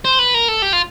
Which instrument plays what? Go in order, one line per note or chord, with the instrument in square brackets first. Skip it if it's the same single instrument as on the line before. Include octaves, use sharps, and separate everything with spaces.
[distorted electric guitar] C5
B4
A#4
A4
G4
F4